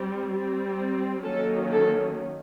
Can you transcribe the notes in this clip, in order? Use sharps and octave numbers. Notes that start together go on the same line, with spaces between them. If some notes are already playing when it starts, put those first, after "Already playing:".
Already playing: G3 C4
G3 C4
D#3 F#3 A#3 C#4 A4
A4